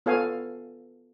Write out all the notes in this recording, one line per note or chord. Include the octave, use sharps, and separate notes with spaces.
B3 F4 A4 C#5 F5 G#5